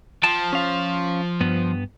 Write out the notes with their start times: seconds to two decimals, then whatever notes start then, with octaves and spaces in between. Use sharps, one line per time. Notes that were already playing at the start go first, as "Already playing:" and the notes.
0.23 F3 G5 A5
0.53 C#4 F5
1.40 G2 B3